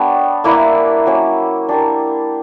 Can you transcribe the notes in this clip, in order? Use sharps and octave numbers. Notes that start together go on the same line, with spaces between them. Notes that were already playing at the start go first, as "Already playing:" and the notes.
Already playing: B3 D4 G4 C#5
A#3 E4 B4 D5
F#3 A#3 C#4
D4 G4 A#4